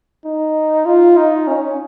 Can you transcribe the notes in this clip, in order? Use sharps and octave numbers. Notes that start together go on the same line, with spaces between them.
D#4
F4
D#4
C#4